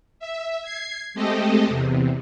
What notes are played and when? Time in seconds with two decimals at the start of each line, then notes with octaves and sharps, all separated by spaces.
0.19 E5
0.62 G#6 C7
1.14 G#3 A3 C4 G4 A4 D#5
1.67 E2 C3